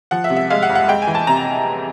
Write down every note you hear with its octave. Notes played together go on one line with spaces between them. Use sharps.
F3 F#5
E5
C3
E5
G#3 F5
F#5
F2
F#5
G#3 G5
G#5
E3
A5
C3 A#5